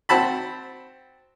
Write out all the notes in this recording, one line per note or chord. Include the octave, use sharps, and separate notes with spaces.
C4 F#4 A5 B5